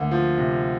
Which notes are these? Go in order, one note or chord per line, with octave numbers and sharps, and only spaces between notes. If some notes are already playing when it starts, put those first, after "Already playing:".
Already playing: D2 A#3
F3
C3